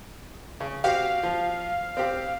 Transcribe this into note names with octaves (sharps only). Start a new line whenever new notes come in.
C#3
C4 F#4 G4 F5
F3
C4 G4